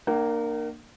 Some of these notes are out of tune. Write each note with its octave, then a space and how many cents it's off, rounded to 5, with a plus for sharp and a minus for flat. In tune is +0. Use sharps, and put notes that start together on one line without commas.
A#3 -5 D4 +40 F#5 +45